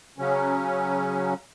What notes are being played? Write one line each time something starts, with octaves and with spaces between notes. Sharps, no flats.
C#3 F#3 C#4